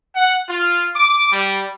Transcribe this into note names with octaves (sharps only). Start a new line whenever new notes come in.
F#5
F4
D6
G3